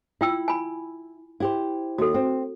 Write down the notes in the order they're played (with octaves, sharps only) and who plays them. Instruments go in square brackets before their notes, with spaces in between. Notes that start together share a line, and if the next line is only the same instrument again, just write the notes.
[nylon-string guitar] E4 [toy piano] F4 G5 E6
[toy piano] G#5 B5
[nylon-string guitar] E4 G4 C5
[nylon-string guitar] D#2 [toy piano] F#4 A4
[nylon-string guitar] C4